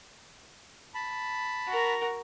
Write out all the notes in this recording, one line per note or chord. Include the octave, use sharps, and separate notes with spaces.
A5 B5
F#4 A#4